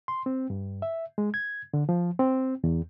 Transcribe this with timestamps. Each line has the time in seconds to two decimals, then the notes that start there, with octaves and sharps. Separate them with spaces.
0.08 C6
0.26 C4
0.50 G2
0.82 E5
1.18 G#3
1.34 G#6
1.74 D3
1.89 F3
2.19 C4
2.64 E2